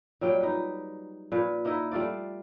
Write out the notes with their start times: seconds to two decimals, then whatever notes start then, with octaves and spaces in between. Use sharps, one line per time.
0.21 A#2 F#3 G3 G5
0.41 D#4 B4
1.32 A#2 B4
1.65 A#3 D#4 E4 D#5
1.92 G3 A3 F4 D5